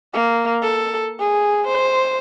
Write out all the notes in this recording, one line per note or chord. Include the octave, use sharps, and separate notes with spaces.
A#3
A4
G#4
C5